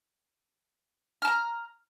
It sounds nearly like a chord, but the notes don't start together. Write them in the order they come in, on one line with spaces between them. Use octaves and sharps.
F6 A5 A#5